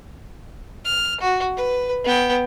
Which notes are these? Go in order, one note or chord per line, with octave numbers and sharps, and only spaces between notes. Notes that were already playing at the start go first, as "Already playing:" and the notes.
F6
F#4
B4
B3 G5